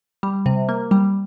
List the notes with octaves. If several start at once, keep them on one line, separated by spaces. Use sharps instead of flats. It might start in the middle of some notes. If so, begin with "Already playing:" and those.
G3
C3
A#3
G3